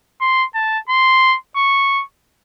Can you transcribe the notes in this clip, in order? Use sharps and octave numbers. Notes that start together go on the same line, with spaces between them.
C6
A5
C6
C#6